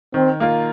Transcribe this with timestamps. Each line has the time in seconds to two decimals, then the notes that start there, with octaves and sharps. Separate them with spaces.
0.14 D#3 C4
0.40 A#3 F4 A#4